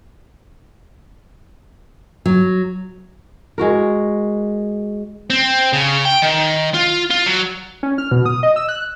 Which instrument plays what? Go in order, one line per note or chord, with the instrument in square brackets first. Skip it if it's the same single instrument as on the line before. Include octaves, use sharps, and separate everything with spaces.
[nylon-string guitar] F#3
[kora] G#3 F#4 A#4
[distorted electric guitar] C4
C#3
G5
D#3
F4
F4
F#3
[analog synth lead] C#4
F6
B2
D#6
D#5
E6
F#6